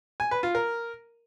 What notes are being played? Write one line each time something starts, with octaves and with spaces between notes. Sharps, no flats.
G#5
B4
F4
A#4